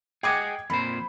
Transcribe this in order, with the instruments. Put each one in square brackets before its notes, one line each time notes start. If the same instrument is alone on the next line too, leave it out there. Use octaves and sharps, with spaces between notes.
[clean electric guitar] G#4 D#5 F#5 [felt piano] G5 D6 G#6
[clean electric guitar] F2 A#2 C5 [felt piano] B5